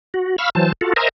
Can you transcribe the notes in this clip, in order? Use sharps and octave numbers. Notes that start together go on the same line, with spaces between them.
F#4
F5 B5 C#6 E6 F6
E3 F#3 C5 A5
F4 F#4 A4
A#4 C5 D#5 E5 G#5 A#5